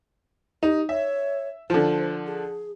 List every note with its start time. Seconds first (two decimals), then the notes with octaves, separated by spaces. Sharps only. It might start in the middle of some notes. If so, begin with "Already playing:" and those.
0.63 D#4 G4
0.89 C#5 E5
1.70 D3 F3 C5
2.27 G#4